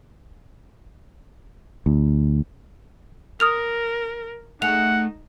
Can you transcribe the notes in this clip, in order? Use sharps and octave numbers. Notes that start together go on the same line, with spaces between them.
D2
A#4 D#6 F6 F7
A3 D#4 G#4 F#5 F7